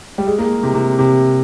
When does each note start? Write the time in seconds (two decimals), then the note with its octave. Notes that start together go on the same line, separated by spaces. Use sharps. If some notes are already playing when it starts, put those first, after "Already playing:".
0.18 G3
0.27 G#3
0.38 A#3
0.63 C3
0.74 C3
0.99 C3